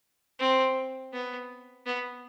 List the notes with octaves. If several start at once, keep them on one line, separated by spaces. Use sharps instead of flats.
C4
B3
B3